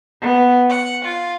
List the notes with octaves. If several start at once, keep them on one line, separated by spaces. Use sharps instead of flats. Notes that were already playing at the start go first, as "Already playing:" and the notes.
B3
F#5
F4